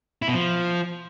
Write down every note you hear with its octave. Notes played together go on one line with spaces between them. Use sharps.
E4
B2
F3